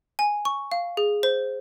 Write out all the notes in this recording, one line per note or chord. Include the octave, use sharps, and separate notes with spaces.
G#5
C#6
F5
G#4
C5